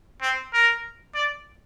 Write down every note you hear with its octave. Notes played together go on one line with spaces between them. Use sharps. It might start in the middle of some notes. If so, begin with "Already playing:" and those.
C4
A#4
D5